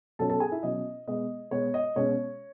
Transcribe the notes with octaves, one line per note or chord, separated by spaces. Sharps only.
B2 F#3 C#4 A4 A5
A4 A5
G#4 G#5
E4 E5
B2 F#3 C#4 D#5
B2 G#3 B3 D#5
B2 G#3 B3 C#5
D#5
B2 G#3 C#4 C#5